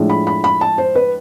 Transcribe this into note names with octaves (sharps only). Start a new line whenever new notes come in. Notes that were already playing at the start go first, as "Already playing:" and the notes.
Already playing: A2 F3 G#3 D4
B5
B5
B5
A5
C5
B4